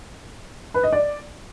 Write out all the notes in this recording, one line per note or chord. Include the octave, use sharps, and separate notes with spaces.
B4
D#5
D5